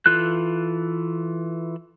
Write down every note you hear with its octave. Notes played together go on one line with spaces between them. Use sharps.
E3 F4 A4 F#6